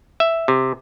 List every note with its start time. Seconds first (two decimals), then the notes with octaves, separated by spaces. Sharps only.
0.20 E5
0.48 C3